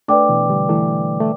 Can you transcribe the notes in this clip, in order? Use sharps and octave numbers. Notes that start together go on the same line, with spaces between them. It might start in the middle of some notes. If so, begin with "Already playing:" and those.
A3 D4 B4 D5 G5 D6
B2 E3
D3 G3
E3 A3
A3